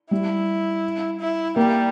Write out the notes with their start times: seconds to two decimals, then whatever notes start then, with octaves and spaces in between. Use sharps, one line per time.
0.11 G3 E4
1.20 E4
1.56 G3 A#3